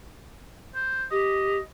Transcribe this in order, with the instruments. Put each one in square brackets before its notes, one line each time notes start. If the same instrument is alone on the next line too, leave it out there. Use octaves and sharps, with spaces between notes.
[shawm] C5
[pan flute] G4 [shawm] D#5